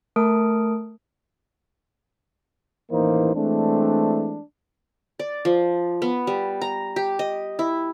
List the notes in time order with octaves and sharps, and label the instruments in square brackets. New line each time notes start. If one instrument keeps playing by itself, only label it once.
[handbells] A3 A#4 A5 D#6 D7
[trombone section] A1 D#2 E3 A#3 D#4 C5
E3 G#3 A3 C4 D4
[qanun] D5
F3
B3
G3
A#5
G4
D#5
E4